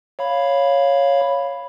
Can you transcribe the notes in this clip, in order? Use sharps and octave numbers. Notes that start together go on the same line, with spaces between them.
C#5 F5 B5